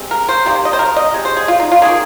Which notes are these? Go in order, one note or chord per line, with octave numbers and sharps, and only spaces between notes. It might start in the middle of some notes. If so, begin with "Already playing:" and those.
Already playing: C3 G#3 C4
A#4
C5
C3 D#3 A#3
D#5
C5
A#4
D#5
C3 G#3
C5
G#4
F4
D#4
F4
D#3 A#3 G#4